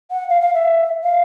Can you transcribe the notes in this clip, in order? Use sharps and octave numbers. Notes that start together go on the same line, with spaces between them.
F#5
F5
F5
E5
F5